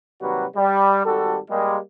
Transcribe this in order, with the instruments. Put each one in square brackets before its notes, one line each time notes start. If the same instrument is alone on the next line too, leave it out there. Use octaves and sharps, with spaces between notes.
[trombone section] D#2 C3 F#3 G3 F#4 B4
G3
G#1 G3 F#4 A4
G3 G#3 A#3